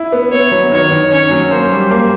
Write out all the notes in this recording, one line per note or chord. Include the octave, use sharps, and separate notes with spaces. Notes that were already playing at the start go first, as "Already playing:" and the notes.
Already playing: E4
B3
B3 C#5
F#3
D#3 C#5
D#3
C#4 C#5
F#3
A#3 C5
G3
A#3